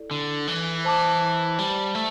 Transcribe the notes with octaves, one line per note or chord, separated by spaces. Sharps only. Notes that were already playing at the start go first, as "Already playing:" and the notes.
Already playing: E4 A4 D5
D3
E3
C5 A5 D6
G3
A3